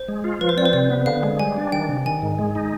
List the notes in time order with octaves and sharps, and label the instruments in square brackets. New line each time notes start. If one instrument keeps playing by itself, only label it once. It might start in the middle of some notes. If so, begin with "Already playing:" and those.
Already playing: [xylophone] C5
[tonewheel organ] G#3
F4
[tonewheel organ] F3 [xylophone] B4
[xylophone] C5
[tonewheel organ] C4 [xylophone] D5
[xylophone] C5
[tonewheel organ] C3 [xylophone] D5
[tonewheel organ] B3
[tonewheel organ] D3 [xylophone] F5
[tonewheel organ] G#3
[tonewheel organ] G3 [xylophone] G#5
[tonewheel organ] D4
[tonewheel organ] D#3 [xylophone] G5
[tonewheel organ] C3
[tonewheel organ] D#3 [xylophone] G#5
[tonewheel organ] G#2
G#3
D#4